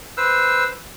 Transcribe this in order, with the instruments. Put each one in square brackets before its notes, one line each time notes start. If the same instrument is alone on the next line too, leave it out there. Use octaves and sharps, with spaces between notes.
[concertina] B4 C5 E6